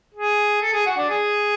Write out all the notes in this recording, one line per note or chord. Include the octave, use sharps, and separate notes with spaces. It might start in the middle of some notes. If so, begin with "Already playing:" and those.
G#4
A4
G#4
F#4
D4
G#4